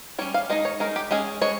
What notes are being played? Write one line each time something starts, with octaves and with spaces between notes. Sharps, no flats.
G3 C#4 C#5
F5
G#3 D#4 D#5
C#5
G#3 D#4 A#4
G4
G#3 C#4 G#4
G#3 C#5